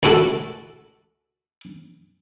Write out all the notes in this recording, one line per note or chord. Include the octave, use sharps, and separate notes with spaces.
C#2 A2 F#4 A4